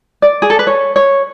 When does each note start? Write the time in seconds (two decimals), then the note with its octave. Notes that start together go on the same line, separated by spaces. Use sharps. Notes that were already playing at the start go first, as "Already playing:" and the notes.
0.22 D5
0.42 G#4
0.50 A4
0.59 B4
0.67 C#5
0.96 C#5